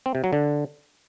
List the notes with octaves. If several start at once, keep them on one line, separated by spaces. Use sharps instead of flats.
C4
C3
F#3
D3